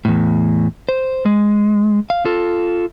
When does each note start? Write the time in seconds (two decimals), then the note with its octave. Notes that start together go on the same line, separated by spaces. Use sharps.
0.05 E2 A2
0.89 C5
1.26 G#3
2.10 F5
2.25 F4 A4